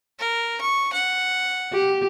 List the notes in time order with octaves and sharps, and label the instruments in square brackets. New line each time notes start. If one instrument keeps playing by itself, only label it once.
[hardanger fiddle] A#4
C#6
F#5
[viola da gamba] G4